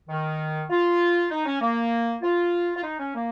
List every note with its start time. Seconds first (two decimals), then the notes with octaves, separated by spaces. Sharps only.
0.09 D#3
0.70 F4
1.30 D#4
1.46 C#4
1.61 A#3
2.22 F4
2.75 F4
2.83 D#4
2.99 C#4
3.15 A#3